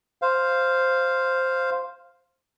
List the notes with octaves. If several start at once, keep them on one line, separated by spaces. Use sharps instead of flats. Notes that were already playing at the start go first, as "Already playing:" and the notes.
C5 F5